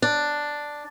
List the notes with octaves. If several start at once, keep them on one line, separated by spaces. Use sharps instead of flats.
D4